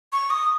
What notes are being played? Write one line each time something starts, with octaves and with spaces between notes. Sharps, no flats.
C#6
D#6